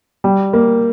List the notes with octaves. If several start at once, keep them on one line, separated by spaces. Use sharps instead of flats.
G3
A#3